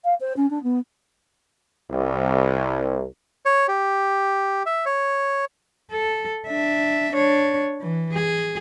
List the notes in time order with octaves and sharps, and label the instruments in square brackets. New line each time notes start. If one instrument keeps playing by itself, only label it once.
[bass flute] F5
C5
C#4
D4
B3
[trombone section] C2
[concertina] C#5
G4
E5
C#5
[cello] A4
D4 E5
D4 C#5
E3
G#4